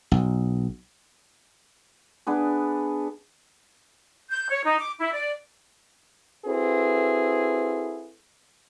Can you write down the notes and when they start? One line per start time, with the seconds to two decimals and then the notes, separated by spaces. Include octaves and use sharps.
0.12 B1
2.27 B3 D4 G#4
4.30 G6
4.50 C#5
4.64 D#4
4.79 D6
4.99 E4
5.12 D5
6.46 C4 E4 F#4 G#4 A4 B4